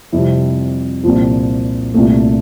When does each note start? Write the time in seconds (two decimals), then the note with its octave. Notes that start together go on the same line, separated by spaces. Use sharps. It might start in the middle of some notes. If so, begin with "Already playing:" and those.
0.12 F2 C3 G3 E4
1.04 C2 A#2 F3
1.94 C2 A#2 A3